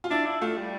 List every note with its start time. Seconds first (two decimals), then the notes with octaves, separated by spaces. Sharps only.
0.04 F4
0.11 D4 E4
0.26 E4
0.41 A3 F4
0.57 G3